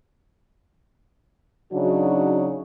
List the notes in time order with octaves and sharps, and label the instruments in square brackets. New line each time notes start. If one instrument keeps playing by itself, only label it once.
[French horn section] C#3 F#3 D4 D#4 F#4